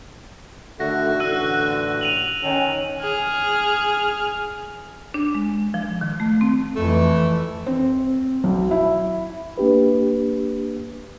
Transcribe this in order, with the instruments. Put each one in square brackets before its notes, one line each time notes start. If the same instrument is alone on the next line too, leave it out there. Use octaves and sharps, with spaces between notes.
[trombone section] D3 D#3 A3 [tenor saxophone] F#4 [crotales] A#6
[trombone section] A1 A2 D3 [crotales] E6 F#6 D#7
[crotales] D#7 F7 F#7
[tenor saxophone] D#3 [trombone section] C#4
[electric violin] G#4 F6
[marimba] D4
G#3
F3
D#3
A3
C4
[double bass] F2 E3 [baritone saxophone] A3
[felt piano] C4
B1
E4
[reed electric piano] A#3 D4 G4 B4